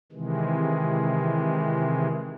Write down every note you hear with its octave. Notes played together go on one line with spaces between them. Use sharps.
C3 D#3 E3 G#3